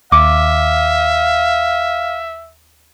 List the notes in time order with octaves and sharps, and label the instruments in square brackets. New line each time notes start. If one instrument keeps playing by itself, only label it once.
[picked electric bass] D#2 [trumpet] E5 [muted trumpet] F5 [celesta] D6